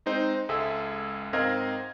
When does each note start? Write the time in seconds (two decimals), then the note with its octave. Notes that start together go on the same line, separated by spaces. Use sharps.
0.06 G#3 C4 D#4 C5
0.49 C#2 G#3 G#4 A4 E5
1.33 G#2 C4 A#4 D#5 F5 G#6